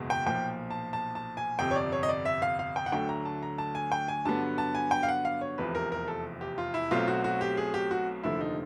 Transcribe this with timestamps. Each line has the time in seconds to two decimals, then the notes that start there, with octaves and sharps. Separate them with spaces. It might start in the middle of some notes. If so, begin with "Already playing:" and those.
Already playing: F#1 E2 B2 G#3 B3
0.10 G5
0.26 B1 A#2 F3 G5
0.71 A5
0.93 A5
1.15 A5
1.37 G#5
1.59 G1 F2 C3 G5
1.71 C#5
1.76 D5
1.92 C#5
2.03 D#5
2.09 D5
2.25 E5
2.42 F5
2.59 F5
2.76 G5
2.86 F#5
2.92 D2 D3 F#3 A3 G5
3.09 A#5
3.25 A5
3.42 A#5
3.58 A5
3.75 G#5
3.92 G5
4.08 G#5
4.25 G2 D3 F#3 B3 A5
4.58 A5
4.75 G#5
4.91 G5
5.03 F5
5.08 F#5
5.25 F5
5.41 C#5
5.58 F1 E2 C3 F3 B4
5.75 A#4
5.92 A#4
6.08 A4
6.41 G4
6.58 F4
6.74 E4
6.91 B1 B2 F#3 A3 C4 F4
7.08 F#4
7.24 F#4
7.41 G4
7.57 G#4
7.74 G4
7.91 F#4
8.23 F1 D#2 D3 F3 A3 E4
8.41 D#4